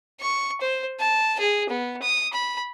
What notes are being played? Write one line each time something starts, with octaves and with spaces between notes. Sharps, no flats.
C#6
C5
A5
G#4
B3
D#6
B5